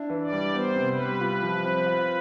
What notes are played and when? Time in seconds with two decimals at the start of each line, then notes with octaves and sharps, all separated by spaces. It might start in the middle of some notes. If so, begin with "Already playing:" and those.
Already playing: D4 E4
0.10 E3
0.21 D5
0.32 G3
0.54 B3 C5
0.76 C3
0.87 B4
0.99 G3
1.20 F4
1.42 F3
1.65 C4
1.87 F4